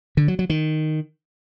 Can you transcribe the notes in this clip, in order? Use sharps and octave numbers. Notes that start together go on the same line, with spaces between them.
D3
F#3
F#3
D#3